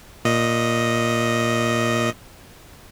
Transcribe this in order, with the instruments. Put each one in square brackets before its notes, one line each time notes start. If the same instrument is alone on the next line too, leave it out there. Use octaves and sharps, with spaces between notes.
[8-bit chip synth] A#2 D#5